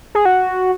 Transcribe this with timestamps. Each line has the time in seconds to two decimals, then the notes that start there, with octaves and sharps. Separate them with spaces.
0.15 G#4
0.25 F#4